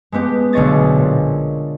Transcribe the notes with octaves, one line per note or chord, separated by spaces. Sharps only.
G#3 A3 B3 G4
B1 D3 G#4 C#5 D#5 A6
A#2